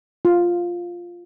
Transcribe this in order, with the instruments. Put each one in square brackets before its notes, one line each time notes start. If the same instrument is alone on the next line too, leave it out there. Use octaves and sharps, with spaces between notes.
[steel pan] F4